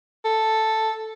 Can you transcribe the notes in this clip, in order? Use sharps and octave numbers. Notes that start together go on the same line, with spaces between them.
A4